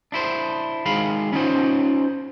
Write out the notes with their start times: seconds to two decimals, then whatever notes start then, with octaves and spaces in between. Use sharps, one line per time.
0.12 D4 E4 C5
0.86 D#3 G#3 F5 B5
1.33 C#4 D#4 F4 C5